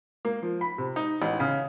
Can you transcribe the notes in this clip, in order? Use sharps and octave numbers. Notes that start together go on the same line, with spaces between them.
A#3
F3
B5
C3
D#4
A1
C#3